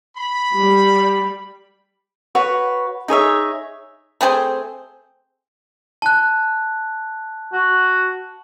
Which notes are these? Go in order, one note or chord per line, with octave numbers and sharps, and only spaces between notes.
B5
G3
F#4 B4 C#5 B5
D#4 G#4 C#5 E5
A3 C4 G#4 C5
A5 F#6
F#4